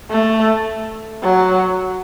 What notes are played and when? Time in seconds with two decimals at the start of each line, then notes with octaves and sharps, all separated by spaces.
0.10 A3
1.23 F#3